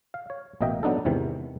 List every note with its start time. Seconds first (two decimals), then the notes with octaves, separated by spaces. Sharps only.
0.14 F5
0.30 C#5
0.61 A1 B2 A#3 D#5 E5 G5
0.83 F#3 B3 D4 D#4 A4
1.05 E2 G#2 C3 D#3 E3